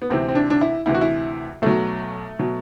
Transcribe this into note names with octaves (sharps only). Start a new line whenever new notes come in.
B3
D2 C3 E3 C4
C4
D4
D4
E4
D2 C3 E3 E4
F#4
E4
B1 B2 F#3 A3
B2 F#3